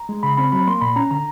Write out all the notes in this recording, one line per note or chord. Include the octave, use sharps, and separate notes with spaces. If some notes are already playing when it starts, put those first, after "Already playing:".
Already playing: A#5
G#3
C#3 B5
C4 B5
F#3 B5
A#3 C6
A#2 B5
C#4 A#5
D3 A#5